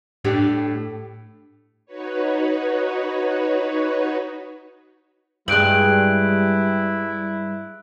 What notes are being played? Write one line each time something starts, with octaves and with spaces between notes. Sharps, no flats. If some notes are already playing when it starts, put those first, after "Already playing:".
A2 D4 G4
D#4 F#4 B4 C#5
G2 G3 G#3 E4 F#6 D7 F#7